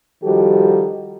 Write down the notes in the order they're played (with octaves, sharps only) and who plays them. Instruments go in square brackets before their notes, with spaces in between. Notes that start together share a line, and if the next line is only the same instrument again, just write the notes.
[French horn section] D#3 F3 G3 F#4 G4 A4